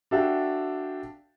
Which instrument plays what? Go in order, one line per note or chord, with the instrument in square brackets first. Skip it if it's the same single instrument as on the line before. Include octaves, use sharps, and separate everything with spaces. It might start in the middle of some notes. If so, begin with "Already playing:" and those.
[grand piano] D4 F#4 A4 E5 F5 G5